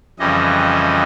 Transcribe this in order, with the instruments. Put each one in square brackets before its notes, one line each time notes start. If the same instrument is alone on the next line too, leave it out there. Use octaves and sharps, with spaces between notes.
[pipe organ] F2 C#3 E3 G3 D#5